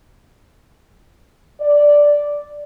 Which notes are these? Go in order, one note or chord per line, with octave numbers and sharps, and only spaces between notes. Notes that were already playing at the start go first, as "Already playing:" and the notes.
D5